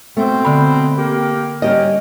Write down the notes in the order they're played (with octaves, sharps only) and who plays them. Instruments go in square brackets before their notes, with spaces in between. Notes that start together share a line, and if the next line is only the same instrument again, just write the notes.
[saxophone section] B2 C4 [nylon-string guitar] A3
[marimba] D3 B5
[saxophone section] A#3 G4 A#4
[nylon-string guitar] G3 G4 D#5 [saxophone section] A#3 C#4